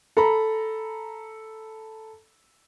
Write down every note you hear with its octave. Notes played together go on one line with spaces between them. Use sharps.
A4 A#5 B5